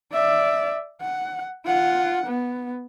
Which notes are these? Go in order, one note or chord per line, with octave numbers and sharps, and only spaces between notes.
D5 E5
F#5
F4 F#5
B3